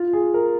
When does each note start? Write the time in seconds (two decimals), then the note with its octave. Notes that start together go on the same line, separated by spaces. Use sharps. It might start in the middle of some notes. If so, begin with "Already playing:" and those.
Already playing: F4
0.13 G#4
0.34 A#4